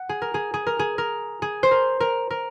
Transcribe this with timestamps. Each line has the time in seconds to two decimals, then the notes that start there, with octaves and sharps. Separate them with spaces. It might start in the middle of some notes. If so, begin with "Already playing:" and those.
Already playing: F#5
0.09 G#4
0.22 A#4
0.34 G#4
0.54 G#4
0.67 A#4
0.79 G#4
0.98 A#4
1.42 G#4
1.63 C5
1.71 A#4
2.00 A#4
2.30 A#4